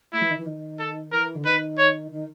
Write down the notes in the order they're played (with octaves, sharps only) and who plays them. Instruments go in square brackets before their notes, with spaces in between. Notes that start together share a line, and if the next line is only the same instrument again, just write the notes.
[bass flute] A3 [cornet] E4
[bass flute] E3
D#3
E3
D#3
[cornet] A4
[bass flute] E3 [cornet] A#4
[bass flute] D3
[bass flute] D#3 [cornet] B4
[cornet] C#5
[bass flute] D#3